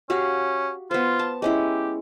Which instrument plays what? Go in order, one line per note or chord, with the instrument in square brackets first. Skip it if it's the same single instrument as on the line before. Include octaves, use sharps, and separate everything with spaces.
[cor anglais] C#4 [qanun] F#4 G4 F5
[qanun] B3 C5 [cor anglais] F4
[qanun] A5
[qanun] G#3 C#4 E4 [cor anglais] G4